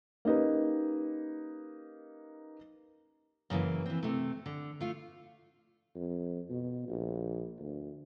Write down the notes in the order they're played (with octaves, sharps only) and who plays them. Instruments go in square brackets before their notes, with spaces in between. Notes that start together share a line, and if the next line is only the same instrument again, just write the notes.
[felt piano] A#3 C#4 D#4 G4 B4
[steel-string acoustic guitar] F#2 C#3 E3 A#3
E3 C4
C3 A3
D3
A3 F4
[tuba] F2
B2
A#1
D2